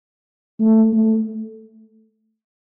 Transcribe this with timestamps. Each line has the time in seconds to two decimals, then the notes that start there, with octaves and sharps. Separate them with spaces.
0.60 A3
0.93 A3